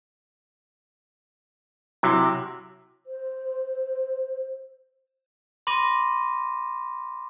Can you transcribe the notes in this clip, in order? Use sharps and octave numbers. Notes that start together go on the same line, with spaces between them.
C3 F#3 E4
C5
B5 C6 D6 A#6 D#7